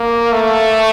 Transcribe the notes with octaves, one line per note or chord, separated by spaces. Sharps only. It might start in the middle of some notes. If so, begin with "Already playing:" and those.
Already playing: A#3
A3